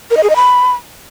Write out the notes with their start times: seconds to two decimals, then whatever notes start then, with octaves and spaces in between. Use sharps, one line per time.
0.11 A#4
0.17 D#5
0.23 G#4
0.30 D#5
0.36 B5